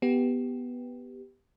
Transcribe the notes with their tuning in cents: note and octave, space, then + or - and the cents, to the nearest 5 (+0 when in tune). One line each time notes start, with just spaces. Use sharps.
B3 +0 G4 +0